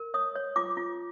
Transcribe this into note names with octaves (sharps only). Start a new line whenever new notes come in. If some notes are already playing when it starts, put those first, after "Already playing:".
Already playing: A#4
C#5 D#6
C#5
F4 D6
F4